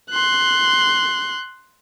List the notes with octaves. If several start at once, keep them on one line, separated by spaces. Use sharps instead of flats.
C6 F#6